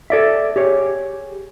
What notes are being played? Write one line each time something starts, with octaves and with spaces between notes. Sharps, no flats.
A4 D5 E5
G4 G#4 C#5